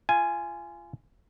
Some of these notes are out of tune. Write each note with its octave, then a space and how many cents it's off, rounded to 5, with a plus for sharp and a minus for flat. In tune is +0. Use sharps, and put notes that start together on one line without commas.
F4 -25 G#5 +0